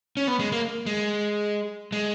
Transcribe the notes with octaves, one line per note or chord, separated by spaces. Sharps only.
C#4
B3
G#3
A#3
G#3
G#3